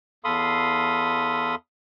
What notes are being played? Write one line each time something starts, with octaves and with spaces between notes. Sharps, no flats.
E2 A4 F5 B5 C6 D#6